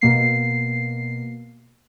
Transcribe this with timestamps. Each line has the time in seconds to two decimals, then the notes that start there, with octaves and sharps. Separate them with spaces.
0.01 B2 A#3 C7